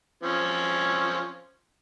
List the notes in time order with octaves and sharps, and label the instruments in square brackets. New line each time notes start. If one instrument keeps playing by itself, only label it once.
[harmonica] F3 C4 C#4